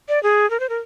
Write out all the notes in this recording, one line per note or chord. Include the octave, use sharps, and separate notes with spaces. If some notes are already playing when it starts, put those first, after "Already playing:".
D5
G#4
A#4
C5
A#4